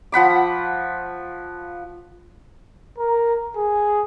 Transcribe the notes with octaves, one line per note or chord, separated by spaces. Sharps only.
F3 F#5 B5 D6
A#4
G#4